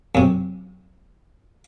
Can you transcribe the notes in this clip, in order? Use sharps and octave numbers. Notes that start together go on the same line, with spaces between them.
F#2 C3